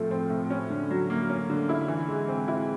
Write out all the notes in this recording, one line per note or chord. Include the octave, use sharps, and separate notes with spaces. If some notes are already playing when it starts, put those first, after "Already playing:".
Already playing: A2 F3 A3 C4
C4
A2
C#4
D3
F#3
A#3
C#4
D3
E4
E3
G#3
C4
E4